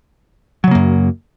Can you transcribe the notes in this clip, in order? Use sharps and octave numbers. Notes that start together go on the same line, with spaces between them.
F#2 C#3 F#3 A#3